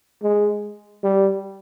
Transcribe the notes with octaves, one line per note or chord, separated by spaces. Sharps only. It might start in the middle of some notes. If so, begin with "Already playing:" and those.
G#3
G3